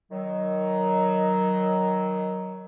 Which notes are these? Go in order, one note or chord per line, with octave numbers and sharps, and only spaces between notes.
D#3 F#3